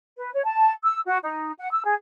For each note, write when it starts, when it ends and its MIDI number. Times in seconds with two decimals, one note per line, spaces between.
0.17 0.31 71
0.32 0.42 73
0.45 0.72 81
0.84 1.01 88
1.06 1.18 66
1.23 1.51 63
1.58 1.67 78
1.72 1.84 88
1.85 1.94 68